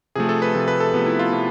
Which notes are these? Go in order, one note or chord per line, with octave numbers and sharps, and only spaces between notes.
C3 F3 A3 G#4
A4
B4
C3 F3 A3
B4
A4
C3 F3 A3 B3
E4
F4
C3 F3 A3